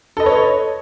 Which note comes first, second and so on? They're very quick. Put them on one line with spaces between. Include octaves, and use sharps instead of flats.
A4 D#5 B4 C#5